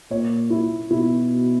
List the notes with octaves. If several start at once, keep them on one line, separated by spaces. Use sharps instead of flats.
A#2 C#5
E4
B2 E4